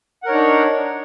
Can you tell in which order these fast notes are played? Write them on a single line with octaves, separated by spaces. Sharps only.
F#5 A#4 C#5 D#4 D4